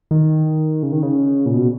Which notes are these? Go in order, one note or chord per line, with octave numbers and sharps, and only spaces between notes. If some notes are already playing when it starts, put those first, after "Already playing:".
D#3
C#3
D#3
C#3
A#2
B2